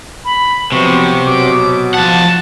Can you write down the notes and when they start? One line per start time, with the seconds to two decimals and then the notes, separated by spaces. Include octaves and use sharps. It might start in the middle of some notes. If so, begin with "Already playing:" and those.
0.25 B5
0.72 C3 F3 F#3 B3 C#6
1.26 B2 F#3 D6
1.94 F3 F#5 A5